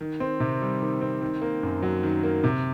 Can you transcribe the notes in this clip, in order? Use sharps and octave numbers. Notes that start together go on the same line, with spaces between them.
D#3
C4
C3
G3
D#3
C4
D#3
A#3
F#2
F#3
D#3
A#3
C3